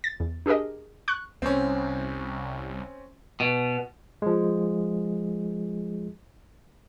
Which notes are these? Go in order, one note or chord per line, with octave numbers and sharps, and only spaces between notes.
A6
E2
D4 G4 G#4 A#4 D#5
C#6 F#6
C2 C4 C#4
B2
F3 G#3